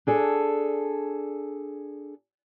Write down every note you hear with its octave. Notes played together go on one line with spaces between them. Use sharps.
D4 G#4 A4